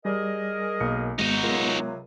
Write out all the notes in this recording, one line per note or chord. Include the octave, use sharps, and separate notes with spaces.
G3 G4 G#4 A#4 D5 D#5
B1 A#3 C#7
G#1 G#3 B3 D#4 F#4 D#7
C#2 C3 F#3 F4 A#4